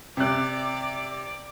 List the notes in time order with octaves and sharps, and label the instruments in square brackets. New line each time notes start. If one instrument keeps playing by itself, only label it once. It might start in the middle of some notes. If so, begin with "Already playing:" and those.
[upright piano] C3 F#6 [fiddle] D5